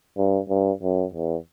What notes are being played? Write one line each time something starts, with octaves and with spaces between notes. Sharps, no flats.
G2
G2
F#2
E2